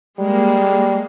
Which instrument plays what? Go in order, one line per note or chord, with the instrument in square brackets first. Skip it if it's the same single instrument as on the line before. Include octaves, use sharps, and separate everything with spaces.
[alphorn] G3 [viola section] G#3 A#3